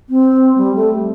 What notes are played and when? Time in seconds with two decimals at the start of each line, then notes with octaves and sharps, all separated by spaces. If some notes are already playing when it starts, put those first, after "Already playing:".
0.09 C4
0.58 G3
0.75 A3